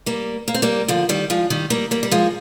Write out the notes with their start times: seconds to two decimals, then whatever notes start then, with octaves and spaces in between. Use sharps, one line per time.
0.06 G3 A#3
0.48 A#3
0.54 C4
0.62 G3 A#3
0.88 D3 F3
1.09 D#3 G3
1.30 F3 G#3
1.50 D#3 G3
1.70 G3 A#3
1.91 G3 A#3
2.03 G3
2.11 F3 G#3